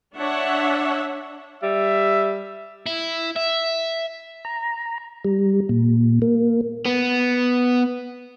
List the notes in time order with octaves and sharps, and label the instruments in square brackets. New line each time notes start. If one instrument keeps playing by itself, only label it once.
[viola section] D4 C#5 E5 F#5
[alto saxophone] G3 [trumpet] E5
[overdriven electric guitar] E4
E5
[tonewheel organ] A#5
G3
A#2
A#3
[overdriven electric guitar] B3